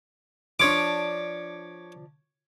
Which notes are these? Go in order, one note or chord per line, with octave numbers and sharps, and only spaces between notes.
F3 D4 C#5 D6